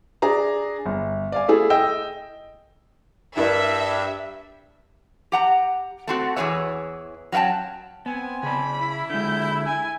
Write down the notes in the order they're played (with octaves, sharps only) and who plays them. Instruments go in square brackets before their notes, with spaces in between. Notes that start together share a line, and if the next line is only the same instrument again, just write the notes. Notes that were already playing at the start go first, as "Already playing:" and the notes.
[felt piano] D4 G#4 D5 A#5
G1
D5 F5 G#5
A3 E4 G#4
D#5 G5 E6
[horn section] G2 [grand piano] E4 A#4 D5 [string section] E5
[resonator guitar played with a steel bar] G4 F#5 A#5
A3 C4 F#4
E2 E3 F4 G#4 C#5 E5
F#3 C#4 E5 G5 A5
[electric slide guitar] B3 [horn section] C4 G#5
[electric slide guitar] C#3 A5 [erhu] B5
[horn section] E4
[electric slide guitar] D3 G#3 [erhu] G6
[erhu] G#5